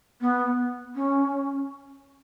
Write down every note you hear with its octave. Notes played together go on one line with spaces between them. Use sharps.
B3
C#4